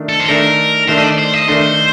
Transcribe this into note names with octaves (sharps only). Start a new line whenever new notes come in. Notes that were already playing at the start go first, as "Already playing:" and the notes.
Already playing: D#3 A3 D4
A4
C5
D#3 A3 D4 A4 A#4
D#3 A3 D4 A4 C5
D#5
D5
C5
D#5
D#3 A3 D4 A4 C5